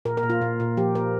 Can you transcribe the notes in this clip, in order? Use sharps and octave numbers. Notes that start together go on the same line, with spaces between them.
A#2 A#4
A#4
A#2
F4
A#2
A#2
F3 G4
A#3 A#4